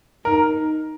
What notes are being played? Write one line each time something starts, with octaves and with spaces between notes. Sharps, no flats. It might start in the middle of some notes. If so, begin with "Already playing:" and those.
D#4 A#4